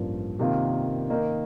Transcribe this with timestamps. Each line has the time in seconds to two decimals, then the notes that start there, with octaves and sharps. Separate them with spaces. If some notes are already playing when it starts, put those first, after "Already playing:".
Already playing: A1 G2 F3 A#3
0.39 C3 D#3 A#3 F4
1.10 D#3 A#3 D#4 A#4